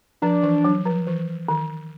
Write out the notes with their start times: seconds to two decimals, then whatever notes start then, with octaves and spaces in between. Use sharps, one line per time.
0.22 F3 D4
0.43 E3
0.64 F#3
0.85 F3
1.07 E3
1.48 D#3